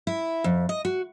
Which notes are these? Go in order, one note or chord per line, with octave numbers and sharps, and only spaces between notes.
E4
F2
D#5
F#4